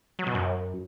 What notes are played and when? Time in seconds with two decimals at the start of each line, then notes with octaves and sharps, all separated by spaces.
0.19 F#3
0.27 B2
0.35 F#2